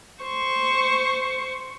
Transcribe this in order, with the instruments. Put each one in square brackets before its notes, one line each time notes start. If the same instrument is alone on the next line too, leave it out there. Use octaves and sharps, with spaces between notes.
[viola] C5 C#6